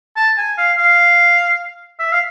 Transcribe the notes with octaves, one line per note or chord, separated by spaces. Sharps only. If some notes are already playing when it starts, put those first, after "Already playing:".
A5
G#5
F5
F5
E5
F5